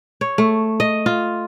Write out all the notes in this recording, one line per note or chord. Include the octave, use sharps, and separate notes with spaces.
C#5
A3
D#5
F4